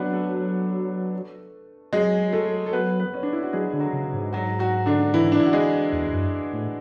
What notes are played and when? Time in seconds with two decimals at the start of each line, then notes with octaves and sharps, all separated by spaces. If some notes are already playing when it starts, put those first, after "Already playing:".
Already playing: F#3 B3 D4 B4 D5
0.13 A3 A4
1.93 F#3 G#3 G#4
2.33 A3 A4
2.66 A4
2.73 B3 B4
3.00 B3 B4
3.14 C#4
3.23 D4
3.33 E4
3.43 F#4
3.53 F#3 G#3 G#4
3.73 D3
3.80 F#3 F#4
3.93 C#3
4.13 G#2
4.33 F#3 F#4
4.59 F#3 F#4
4.86 D3 D4
5.14 E3 E4
5.32 D4
5.39 E4
5.46 F#4
5.53 G#3 G#4
5.93 E2
6.13 F#2
6.53 A2